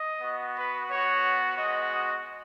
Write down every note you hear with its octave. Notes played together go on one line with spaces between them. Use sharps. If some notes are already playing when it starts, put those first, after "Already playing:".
Already playing: D#5
B3 F#4
B4
B3 F#4 C#5
G#3 B3 F#4 D#5
D#5